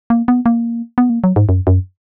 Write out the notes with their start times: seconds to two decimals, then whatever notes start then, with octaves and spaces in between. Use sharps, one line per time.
0.10 A#3
0.28 B3
0.46 A#3
0.98 B3
1.10 A#3
1.24 F#3
1.36 G#2
1.49 F#2
1.67 F#2